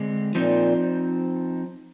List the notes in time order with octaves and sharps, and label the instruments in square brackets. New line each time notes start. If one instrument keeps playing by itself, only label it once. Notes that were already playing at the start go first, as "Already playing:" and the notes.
Already playing: [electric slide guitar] D3 G#3 C4
[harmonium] A#2 [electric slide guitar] F3 C4 D#4